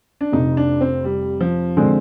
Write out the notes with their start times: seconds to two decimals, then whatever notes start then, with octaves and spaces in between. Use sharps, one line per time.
0.21 D4
0.32 F1 F2 C3 D#4
0.57 D4
0.81 C4
1.04 G3
1.41 F3
1.77 D3 G#3 C4